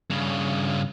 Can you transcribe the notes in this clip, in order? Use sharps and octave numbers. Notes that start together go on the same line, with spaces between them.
G2 C#3